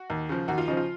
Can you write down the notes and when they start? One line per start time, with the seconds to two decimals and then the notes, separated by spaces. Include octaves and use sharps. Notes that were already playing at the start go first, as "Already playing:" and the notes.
Already playing: F#4
0.10 D#2
0.29 C#3 F3
0.48 D#2 F#4
0.58 F4
0.68 C#3 F3 D#4
0.77 F4